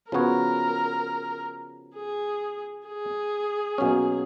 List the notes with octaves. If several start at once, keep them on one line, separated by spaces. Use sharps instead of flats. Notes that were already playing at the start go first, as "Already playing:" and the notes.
C#3 F3 B3 F#4 A#4 C#5
G#4
G#4
B2 F#3 A#3 C#4